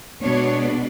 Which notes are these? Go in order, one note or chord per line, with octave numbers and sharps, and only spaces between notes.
B2 G#3 B3 D4 C#5